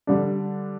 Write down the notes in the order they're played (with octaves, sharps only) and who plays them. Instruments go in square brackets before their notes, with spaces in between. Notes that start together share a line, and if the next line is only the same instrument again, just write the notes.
[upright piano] D3 G3 D4